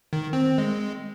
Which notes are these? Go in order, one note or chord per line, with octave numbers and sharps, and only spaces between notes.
D#3
C4
G#3